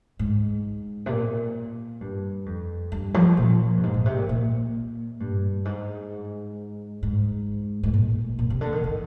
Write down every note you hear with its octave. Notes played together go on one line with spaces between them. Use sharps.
G#2
C3
A#2
G2
F2
G2
F3
A#2
G2
G#2
A#2
C3
A#2
A#2
G2
G#2
G#2
G#2
A#2
A#2
C3
D3
D#3
D#3